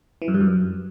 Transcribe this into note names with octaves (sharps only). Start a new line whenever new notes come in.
E3
F#2
G2
F#2